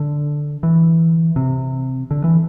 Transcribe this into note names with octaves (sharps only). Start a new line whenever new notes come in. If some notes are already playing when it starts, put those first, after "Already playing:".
Already playing: D3
E3
C3
D3
E3